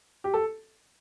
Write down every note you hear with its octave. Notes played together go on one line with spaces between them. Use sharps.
G4
A4